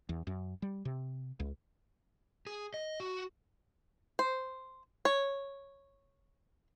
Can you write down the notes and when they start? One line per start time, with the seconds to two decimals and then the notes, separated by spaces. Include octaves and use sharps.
0.09 E2
0.27 F#2
0.62 G3
0.85 C3
1.40 C#2
2.47 G#4
2.74 D#5
3.00 F#4
4.19 C5
5.05 C#5